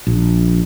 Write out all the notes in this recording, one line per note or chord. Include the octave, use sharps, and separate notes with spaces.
A#1